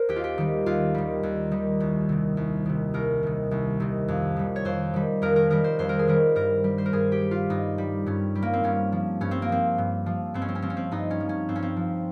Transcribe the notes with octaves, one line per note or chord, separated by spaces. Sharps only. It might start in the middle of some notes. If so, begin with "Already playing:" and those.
Already playing: A#4 C5
D#2 G4
F4
G4
D#3 G3
D#2 F4
D#3 G3
D#2
D#3 G3
C2
C3 D#3
C2
C3 D#3
C2 A#4
C3 D#3
C2
C3 D#3
F2
D#3 G3
C#5
F2 C5
D#3 G3
F2 A#4
A#4
D#3 G3 A#4
C5
F2 C5
A#4
G#4
D#3 G3 A#4
G2 A#4
G3
C5
A#4
G2 G#4
G4
G3
F4
G2 D#4
G3
G2 C#4
G3
A#3
C4
G2 C#4
F3
G2 C#4
C4
A#3
F3 C4
G2
F3
G2 C4
C#4
C4
C#4
F3 C4
C#4
C4
G2 D#4
C#4
F3
C#4
G2 C4
C#4
C4
F3